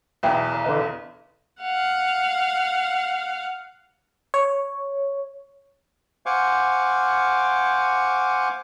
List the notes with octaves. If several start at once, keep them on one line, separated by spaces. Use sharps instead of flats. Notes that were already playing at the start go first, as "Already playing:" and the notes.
B1 E2 B4 E5 G5
D3 E3 D#5
F5 F#5
C#5
C5 F5 F#5 G#5 C#6 D6